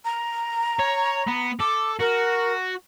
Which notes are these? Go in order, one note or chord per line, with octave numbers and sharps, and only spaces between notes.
A#5
C#5
B3
A4 D6
F#4 A#4